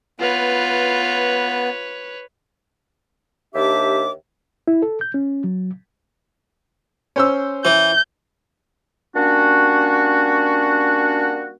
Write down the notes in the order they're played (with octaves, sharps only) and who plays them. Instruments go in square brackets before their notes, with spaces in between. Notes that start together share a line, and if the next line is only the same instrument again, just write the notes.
[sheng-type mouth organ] B3 [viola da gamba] F4 [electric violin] B4 C#5
[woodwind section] D#2 D4 G4 E5 D6
[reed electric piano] E4
A4
G6
C#4
F#3
[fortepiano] C#4 C5 E6
[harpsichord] E3 [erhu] G6
[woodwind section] G3 A#3 C#4 D4 F#4